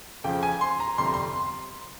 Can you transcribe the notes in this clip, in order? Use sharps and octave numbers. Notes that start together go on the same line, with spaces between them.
F2 C#3 F3 G5
G#5
C6
A#5
G1 F2 C3 G3 C6
A#5
C6